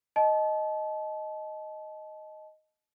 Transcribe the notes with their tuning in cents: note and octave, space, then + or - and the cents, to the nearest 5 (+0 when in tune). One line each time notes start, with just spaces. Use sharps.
D#5 +0 A5 -30